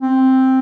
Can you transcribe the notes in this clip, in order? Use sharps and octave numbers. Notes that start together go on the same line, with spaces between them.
C4